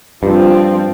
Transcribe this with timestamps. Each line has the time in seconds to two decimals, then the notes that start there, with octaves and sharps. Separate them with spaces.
0.23 G2 F3 C4